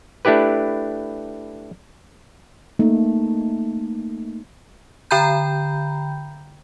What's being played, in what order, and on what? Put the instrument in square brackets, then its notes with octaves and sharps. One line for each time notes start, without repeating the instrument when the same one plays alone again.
[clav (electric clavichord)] A3 D4 E4 G4 B4
[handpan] A3 A#3 D#4
[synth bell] D3 G5 A#5 B5 G6